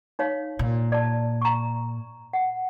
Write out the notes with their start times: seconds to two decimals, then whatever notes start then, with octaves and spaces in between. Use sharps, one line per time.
0.19 D#4 C#5 F5
0.59 A#2
0.92 D5 A5
1.41 A#5 C#6
2.33 F#5